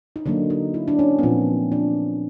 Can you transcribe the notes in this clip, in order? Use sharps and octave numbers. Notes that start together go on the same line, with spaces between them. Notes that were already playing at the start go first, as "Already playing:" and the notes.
D#4
D3 F#3 A#3 D4
D#4
E4
D4
C#4
B3
A#2 F3 A#3 C4
D4